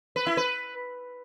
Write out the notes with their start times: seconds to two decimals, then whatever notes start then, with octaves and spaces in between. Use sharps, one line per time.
0.16 B4
0.27 E4
0.37 B4